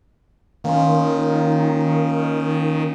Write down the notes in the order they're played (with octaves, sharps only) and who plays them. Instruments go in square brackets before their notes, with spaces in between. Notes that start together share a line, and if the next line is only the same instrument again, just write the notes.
[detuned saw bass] D#3 [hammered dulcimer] A#3 C#4 F4